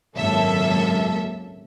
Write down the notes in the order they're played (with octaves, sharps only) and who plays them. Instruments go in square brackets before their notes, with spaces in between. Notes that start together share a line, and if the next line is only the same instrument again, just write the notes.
[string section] G#1 C#2 F#2 A#3 A4 E5